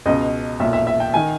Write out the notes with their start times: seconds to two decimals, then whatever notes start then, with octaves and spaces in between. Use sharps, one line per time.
0.06 C#2 B2 D#5
0.60 B1 A#2 E5
0.73 E5
0.87 E5
1.00 G5
1.14 D#3 G#5